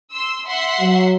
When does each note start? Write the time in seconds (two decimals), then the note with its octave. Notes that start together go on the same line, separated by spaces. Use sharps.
0.11 C6 E6
0.47 E5 F#5 C6
0.80 F#3